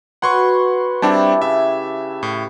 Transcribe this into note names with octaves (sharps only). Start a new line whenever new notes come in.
F#4 B4 C#5 F#5 C6 C#6
G3 C4 D4 E4 G4 A5
C#3 E5
A2